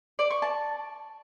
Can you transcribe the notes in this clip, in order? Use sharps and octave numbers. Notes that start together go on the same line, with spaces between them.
D5
C#6
A5